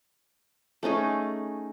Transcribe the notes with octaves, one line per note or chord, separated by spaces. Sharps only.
A3 C#4 D#4 G#4